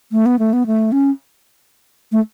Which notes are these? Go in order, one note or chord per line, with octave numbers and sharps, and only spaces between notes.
A3
B3
A3
B3
A3
C#4
A3